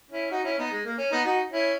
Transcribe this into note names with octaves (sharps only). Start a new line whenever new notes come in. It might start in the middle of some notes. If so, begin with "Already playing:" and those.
C#4 E4
D#4 F#4
C#4 E4
B3 D#4
G#3
A#3
C#4
B3 D#4
D#4 F#4
C#4 E4